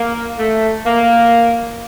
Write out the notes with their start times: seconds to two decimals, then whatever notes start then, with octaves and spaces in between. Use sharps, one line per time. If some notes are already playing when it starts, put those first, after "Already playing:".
Already playing: A#3
0.39 A3
0.86 A#3